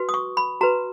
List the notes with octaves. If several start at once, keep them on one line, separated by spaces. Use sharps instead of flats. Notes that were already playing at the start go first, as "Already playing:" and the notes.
Already playing: F#4 B4
D#6
C#6
B5
F#4 B4 A#5